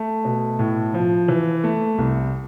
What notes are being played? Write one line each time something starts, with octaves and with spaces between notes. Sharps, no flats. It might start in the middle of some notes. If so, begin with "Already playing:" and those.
Already playing: A3
B2
A2
F3
E3
A3
C2